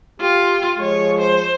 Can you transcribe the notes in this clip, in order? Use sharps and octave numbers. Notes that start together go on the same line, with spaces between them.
F4 G4
F3 G#3 C#5
C5